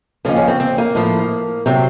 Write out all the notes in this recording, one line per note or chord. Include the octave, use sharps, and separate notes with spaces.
D#2 C#3 F3 C#4
C#4
C4
C4
A#3
A2 F3
C3 F#3 C4